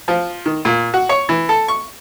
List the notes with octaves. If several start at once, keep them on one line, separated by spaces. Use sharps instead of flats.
F3
D#3
A#2
F#4
C#5
E3
A4
C#6